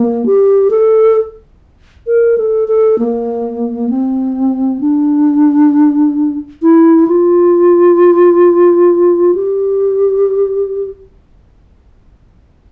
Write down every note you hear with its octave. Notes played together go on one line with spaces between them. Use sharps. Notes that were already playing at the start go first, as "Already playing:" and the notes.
Already playing: A#3
G4
A4
A#4
A4
A4
A#3
C4
D4
E4
F4
G4